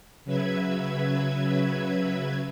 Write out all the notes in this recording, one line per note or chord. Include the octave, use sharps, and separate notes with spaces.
C#3 F#3 B4 E5 G#6